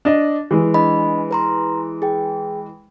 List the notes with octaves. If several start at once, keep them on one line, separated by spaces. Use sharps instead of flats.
D4 D#5
E3 G#3
D4 D#5 B5
B4 A#5 C6
G#4 G5